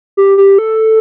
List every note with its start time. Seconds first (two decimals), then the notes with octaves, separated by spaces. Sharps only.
0.17 G4
0.38 G4
0.58 A4